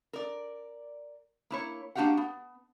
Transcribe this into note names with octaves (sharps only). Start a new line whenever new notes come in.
A#4 D5
A#3 E4 C#5
A#3 D4 F#4 G4 F5 F#5
B3